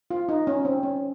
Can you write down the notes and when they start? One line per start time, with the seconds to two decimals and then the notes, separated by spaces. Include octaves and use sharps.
0.11 F4
0.29 D#4
0.47 C#4
0.65 C4
0.83 C#4